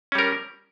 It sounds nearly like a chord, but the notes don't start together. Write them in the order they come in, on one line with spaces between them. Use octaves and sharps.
C#4 G3 A#4